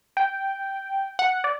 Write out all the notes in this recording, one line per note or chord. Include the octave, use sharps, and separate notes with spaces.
G5
F#5
D5